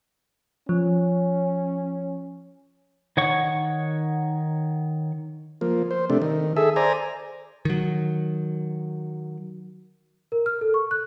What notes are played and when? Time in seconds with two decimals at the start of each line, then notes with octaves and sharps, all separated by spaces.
0.69 F3 C#4
3.17 D#3 C#5 F#5 C#6
5.61 F3 A#3
5.91 C5
6.10 C3 A3 D4
6.22 D#3
6.56 G#4 A4 E5
6.76 C5 D5 G#5 A#5
7.65 D#3 F#3
10.32 A#4
10.46 F6
10.61 A4
10.74 C#6
10.91 F#6